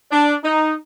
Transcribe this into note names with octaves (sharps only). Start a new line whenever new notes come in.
D4
D#4